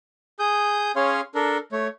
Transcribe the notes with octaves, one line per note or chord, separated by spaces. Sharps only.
G#4 D#6 G6
C#4 G#4 C#5 F5 C6
D4 A4 A#4
A3 C#5